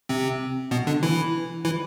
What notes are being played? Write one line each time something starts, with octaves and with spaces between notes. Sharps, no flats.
C3 C4
B2 B3
D3 D4
E3 E4
E3 E4